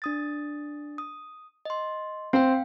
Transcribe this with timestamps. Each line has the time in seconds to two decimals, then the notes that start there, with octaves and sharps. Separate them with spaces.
0.02 D4 D#6 A6
0.98 D#6
1.65 D#5 C6
2.33 C4 F5 G5